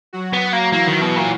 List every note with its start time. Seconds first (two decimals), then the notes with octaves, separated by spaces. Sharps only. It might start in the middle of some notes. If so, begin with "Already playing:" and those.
0.13 F#3 F#4
0.33 B3
0.53 A#3
0.72 E3 A#3 E4
0.87 D#3
1.01 B2 E3 E4
1.16 A#2